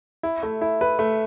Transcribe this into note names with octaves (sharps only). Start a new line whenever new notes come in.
E4
A3
E4
B4
A3